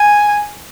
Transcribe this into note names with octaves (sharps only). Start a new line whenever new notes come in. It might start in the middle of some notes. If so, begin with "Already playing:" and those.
Already playing: G#5